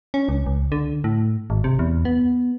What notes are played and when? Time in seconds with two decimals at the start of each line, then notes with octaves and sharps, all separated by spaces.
0.14 C#4
0.29 C#2
0.46 C#2
0.72 D3
1.04 A2
1.50 G#1
1.64 C3
1.79 E2
2.05 B3